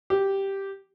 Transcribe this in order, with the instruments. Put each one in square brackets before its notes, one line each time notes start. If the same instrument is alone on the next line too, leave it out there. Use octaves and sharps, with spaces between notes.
[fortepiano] G4